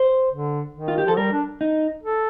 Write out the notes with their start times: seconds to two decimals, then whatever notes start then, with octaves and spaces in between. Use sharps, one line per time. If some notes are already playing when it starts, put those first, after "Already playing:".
Already playing: C5
0.32 D3
0.75 D#3
0.88 F4
0.98 G4
1.06 F3 A4
1.17 G3 A#4
1.32 D4
1.61 D#4
2.03 A4